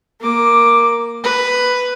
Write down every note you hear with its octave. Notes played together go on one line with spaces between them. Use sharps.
A#3 D6
B4